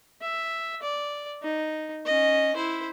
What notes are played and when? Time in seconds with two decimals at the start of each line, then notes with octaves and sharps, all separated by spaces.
0.22 E5
0.83 D5
1.42 D#4
2.06 C#4 D#5
2.55 E4 C5